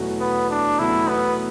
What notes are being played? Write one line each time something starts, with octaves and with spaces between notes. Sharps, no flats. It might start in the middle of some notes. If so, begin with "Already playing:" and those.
Already playing: E2 B2 F#3 A3 F#4
B3
D4
E2 B2 F#3 A3 E4 F#4
B3